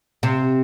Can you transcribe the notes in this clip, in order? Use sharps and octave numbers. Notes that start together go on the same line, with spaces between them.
C3